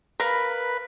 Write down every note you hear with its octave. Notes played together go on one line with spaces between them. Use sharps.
A#4 B4 F5 B5